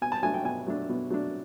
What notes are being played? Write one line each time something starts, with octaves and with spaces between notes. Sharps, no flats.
B2 G#5
A5
F#3 A3 D4 G#5
G5
B2 G#5
F#3 A3 D4
B2
F#3 A3 D4